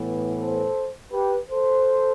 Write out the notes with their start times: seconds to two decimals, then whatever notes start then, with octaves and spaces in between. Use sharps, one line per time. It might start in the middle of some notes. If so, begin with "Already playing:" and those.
Already playing: A2 E3 B3
0.39 A4 C5
1.12 G4 B4
1.50 A4 C5